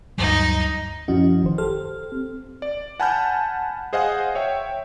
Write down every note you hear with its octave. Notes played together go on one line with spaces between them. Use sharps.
D2 G2 F#3 D#4
F#2 F3 C#4 E4 F#4 D#5
G#1 D#3 C5
G4 A4 C5 F6
C4
D5
F#5 G#5 A5 B5 F6 G6
G#4 C5 D#5 F5 F#5 G#5
C#5 E5 G5